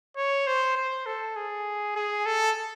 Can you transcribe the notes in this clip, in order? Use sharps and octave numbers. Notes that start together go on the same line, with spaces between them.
C#5
C5
C5
A4
G#4
G#4
A4